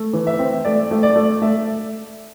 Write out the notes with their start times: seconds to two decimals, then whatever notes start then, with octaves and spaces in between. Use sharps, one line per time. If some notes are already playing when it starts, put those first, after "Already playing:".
Already playing: A3
0.13 E3
0.27 E5
0.39 C4
0.65 A3 D5
0.91 A3
1.03 D5
1.16 A3
1.42 A3 E5